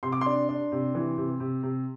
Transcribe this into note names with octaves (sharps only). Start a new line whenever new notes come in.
C3 C6
D6
C6
D4
D4
C3
E3
C3
C3
C3